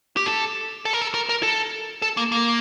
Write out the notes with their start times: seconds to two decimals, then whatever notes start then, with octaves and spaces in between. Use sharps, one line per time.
0.17 G4
0.26 A4
0.85 A4
0.93 A#4
1.02 A4
1.14 A#4
1.29 A#4
1.43 A4
2.02 A4
2.17 A#3
2.32 A#3